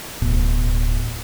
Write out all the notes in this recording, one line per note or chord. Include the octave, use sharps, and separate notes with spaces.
D1 B2